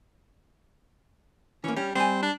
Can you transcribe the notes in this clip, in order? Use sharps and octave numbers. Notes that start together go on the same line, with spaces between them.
E3 A#3 C#4
G3 C#4
G3 C4 G#5
D4